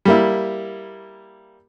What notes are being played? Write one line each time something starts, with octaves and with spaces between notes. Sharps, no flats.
G3 A#3 E4